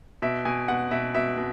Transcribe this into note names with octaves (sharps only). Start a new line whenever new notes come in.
B2 E5
B2 G#5
B2 F#5
B2 E5
B2 E5
B2